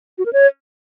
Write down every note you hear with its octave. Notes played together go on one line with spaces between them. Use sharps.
F#4
A#4
C#5